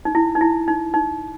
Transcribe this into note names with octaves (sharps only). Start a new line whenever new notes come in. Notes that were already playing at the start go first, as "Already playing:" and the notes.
D#4
E4
D#4
E4
D#4
D#4